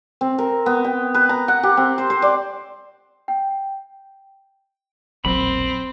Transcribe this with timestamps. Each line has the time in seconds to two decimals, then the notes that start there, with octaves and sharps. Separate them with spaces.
0.21 C4
0.38 A#4
0.66 B3
0.84 G5
1.14 B4
1.29 A#5
1.48 F#5
1.63 G4
1.77 C4
1.98 C5
2.10 C5
2.22 D5
3.28 G5
5.25 E1 A#1 F#3 C4 B5